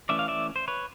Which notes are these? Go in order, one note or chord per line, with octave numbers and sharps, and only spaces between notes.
E3 A3 C#4 D5 E5
F5
D5 E5
C5
B4 C#5